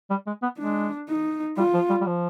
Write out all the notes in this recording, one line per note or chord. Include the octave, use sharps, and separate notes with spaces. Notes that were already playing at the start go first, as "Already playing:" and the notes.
G3
G#3
B3
G#3 D4
D#4
G3 F4
F3
G3
G3
F3